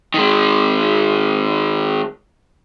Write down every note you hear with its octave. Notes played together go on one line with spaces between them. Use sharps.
D#3 G#3